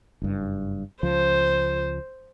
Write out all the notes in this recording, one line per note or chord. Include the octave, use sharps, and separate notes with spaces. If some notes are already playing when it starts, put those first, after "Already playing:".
F#1 G2
C#2 F3 C5